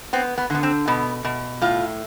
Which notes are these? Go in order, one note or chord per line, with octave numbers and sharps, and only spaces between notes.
B3 C4
B3
D3 B3
C4
B2 B3
B2
A2 F4